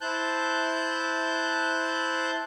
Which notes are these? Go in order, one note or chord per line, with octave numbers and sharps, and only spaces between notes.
E4 C5 A5 F#6 G6